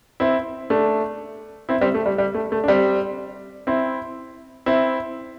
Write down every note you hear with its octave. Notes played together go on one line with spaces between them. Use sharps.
C4 E4
A3 D4
C4 E4
G3 C4
A3
G3
G3
A3
A3
D4
G3 C4
C4 E4
C4 E4